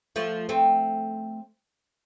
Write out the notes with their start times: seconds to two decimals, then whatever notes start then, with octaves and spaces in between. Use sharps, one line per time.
0.16 F3 A3
0.49 A3 C4